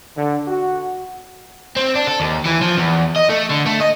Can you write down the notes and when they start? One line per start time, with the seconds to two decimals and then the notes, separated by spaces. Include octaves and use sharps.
0.17 D3
0.48 F#4
1.76 C4
1.95 D4
2.07 A4
2.20 D#2
2.45 E3
2.61 F3
2.78 E2
3.16 D#5
3.29 A3
3.50 D3
3.66 A3
3.80 D#5